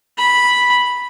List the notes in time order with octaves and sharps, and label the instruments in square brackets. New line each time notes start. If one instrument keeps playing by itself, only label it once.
[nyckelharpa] B5